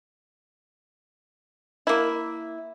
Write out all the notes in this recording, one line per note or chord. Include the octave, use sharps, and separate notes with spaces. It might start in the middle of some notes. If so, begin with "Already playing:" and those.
A#3 E4